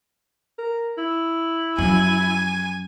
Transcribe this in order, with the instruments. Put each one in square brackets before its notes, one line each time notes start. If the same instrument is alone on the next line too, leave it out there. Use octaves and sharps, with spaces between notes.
[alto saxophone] A#4
E4
[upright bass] F#2 F3 [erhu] G#5